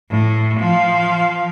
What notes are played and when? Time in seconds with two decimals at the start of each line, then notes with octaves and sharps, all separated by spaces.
0.10 A2
0.59 F3 F5